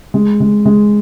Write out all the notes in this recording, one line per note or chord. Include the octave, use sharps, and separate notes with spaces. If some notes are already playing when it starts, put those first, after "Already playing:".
G#3
G#3
G#3